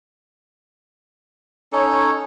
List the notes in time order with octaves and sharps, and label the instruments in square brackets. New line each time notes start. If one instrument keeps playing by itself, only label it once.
[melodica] C#4 D#4 A4 [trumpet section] C#5